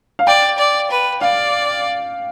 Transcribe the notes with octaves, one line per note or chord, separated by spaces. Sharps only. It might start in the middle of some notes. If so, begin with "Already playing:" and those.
F5
D5 G5
D5
B4
D5 F5